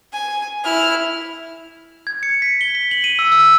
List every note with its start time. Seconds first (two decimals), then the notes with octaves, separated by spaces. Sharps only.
0.13 G#5
0.64 E4 F6
2.07 G#6
2.23 C#7
2.42 B6
2.61 G7
2.75 B6
2.91 F#7
3.04 D#7
3.19 E6
3.32 E6